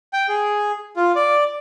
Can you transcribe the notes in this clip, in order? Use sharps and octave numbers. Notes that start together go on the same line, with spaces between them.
G5
G#4
F4
D5